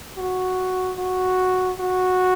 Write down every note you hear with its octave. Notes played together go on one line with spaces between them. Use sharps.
F#4
F#4
F#4